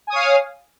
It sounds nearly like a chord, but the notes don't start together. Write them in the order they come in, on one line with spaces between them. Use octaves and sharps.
G#5 D#6 C#5 F5